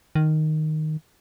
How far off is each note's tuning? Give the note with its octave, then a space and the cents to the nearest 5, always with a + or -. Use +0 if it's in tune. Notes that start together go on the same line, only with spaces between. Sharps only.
D#3 -5